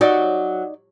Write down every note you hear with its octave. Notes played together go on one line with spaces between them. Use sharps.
F#3 D#4 D5